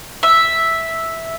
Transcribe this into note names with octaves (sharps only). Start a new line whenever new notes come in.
E5